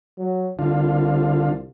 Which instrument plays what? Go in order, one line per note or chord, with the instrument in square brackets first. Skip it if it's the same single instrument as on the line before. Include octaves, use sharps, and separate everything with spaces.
[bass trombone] F#3
[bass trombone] C2 [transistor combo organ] D3 F4